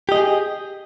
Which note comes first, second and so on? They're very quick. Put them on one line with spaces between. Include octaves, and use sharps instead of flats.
G4 D#5 G#4